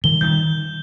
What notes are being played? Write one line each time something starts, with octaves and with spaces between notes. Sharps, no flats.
D#3 G3 G7
D#3 G3 G6